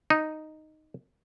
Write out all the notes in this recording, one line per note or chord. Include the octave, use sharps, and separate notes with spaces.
D#4